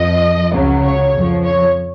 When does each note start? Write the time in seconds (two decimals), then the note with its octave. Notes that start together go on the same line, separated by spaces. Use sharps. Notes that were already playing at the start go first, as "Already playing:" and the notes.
Already playing: F2 F3 D#5
0.53 C#2 C#3 F#3
0.84 C#5
1.14 F2 F3
1.44 C#5